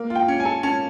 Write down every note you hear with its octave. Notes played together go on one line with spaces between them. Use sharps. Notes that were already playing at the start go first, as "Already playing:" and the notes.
Already playing: A#3
F4
G5
C#4
G#5
A4
C#4 A5